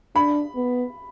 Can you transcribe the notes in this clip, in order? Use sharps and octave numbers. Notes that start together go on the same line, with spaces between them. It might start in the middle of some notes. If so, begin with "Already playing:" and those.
D4 B5
B3